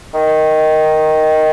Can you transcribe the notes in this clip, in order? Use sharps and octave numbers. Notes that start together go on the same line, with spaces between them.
D#3